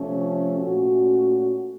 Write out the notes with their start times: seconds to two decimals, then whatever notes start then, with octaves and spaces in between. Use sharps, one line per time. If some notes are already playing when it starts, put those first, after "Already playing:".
Already playing: C3 F3 A3 C#4
0.58 A#2 A3 C#4 F#4